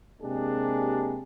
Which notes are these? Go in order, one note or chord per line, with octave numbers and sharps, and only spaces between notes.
C3 G#3 A#3 D4 G4 G#4